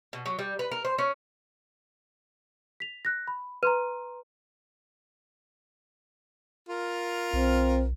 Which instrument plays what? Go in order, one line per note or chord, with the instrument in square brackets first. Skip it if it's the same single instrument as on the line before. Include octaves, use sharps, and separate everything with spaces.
[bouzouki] B2
F#3
G3
B4
A#4
C5
C#4
[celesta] B6 F7
F#6 A#6
B5
[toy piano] B4 [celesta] A#5 C6 D#7
[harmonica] F4 A#4
[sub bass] B1 [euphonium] C4